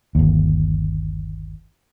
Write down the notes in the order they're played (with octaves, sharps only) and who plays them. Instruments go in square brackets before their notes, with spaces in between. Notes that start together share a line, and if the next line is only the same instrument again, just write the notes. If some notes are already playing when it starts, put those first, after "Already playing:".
[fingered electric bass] G1 D#2